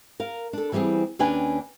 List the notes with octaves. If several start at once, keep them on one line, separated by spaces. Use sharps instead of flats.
A#4 F5
D4 A4
E3 G3 B3 C4 G#4
D#2 C#4 D4 B4 G5 G#5